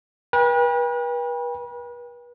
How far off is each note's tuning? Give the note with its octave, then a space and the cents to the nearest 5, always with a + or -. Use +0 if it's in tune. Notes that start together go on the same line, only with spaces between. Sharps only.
B4 -40 G5 +35